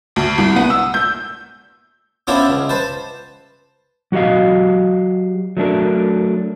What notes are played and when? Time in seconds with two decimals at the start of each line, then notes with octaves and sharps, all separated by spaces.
0.16 D2
0.38 C2
0.56 B3
0.70 E6
0.94 G6
2.27 B3 C#4 D4 E4 F4 C5
2.49 C#2
2.69 B4 C5 A5
4.12 F#3 F#4 G4 D#5 F5
5.57 F#3 A3 D4 A#4